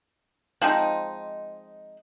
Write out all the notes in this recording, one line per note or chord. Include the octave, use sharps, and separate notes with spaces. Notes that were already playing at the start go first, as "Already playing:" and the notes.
F3 G#3 C4 D#4